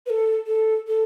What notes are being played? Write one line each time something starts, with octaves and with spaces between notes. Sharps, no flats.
B4
A4
A4
A4